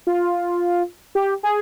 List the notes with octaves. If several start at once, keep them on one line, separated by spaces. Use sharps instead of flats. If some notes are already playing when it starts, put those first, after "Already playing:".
F4
G4
G#4